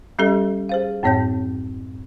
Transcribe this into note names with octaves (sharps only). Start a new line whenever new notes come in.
G3 C#4 G4 A4 D#5
G#4 C5 F5
F#2 A2 C4 C#5 G5 G6